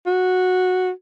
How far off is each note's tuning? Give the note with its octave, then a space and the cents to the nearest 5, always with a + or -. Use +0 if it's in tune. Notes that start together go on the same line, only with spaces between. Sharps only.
F#4 -10